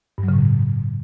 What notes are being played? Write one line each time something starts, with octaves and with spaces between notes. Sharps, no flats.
G2
F#3
C#3
A2
C#3